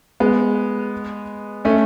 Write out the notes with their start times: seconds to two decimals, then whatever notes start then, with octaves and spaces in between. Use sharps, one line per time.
0.20 G#3 B3
1.65 A3 C#4